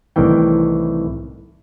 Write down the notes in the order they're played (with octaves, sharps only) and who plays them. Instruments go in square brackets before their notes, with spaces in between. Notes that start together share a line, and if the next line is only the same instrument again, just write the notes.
[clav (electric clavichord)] C2 A2 D#3 E3 G5